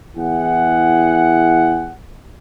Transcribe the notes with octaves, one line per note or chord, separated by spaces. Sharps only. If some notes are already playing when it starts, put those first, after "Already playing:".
E2 E4 G#4 F#5